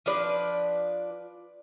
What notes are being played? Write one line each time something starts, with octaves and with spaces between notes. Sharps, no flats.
F3 D4 B4 D5